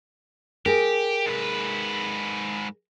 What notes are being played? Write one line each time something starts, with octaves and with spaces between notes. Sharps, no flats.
G4 G#4 A#4
G#2 B4